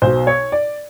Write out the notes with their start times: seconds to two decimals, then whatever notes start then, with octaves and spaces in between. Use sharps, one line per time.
0.02 B1 B2 C5
0.27 C#5
0.52 D5